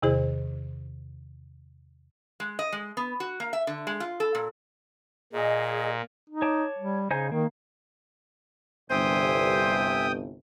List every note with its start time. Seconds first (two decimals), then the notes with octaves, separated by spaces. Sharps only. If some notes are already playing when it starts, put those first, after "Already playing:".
0.02 E2 C3 D#3 E4 G#4 C5
2.40 G#3
2.59 D#5
2.72 G#3
2.97 B3
3.20 F#4
3.40 A#3
3.53 E5
3.67 D3
3.87 G#3
4.00 F4
4.20 A4
4.35 A#2
5.33 A#2 G#4 D#5
6.30 D#4
6.42 C#5 A5 D6
6.79 G3
7.11 C#3 D#4 C5 G#5
7.32 D#3 A#3
8.90 G1 C2 C5 E5 G5 G#5 D#6